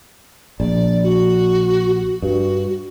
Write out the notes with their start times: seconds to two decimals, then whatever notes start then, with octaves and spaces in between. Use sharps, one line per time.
0.60 A#1 D5
1.03 F#4
1.94 F#4
2.22 G2 F#4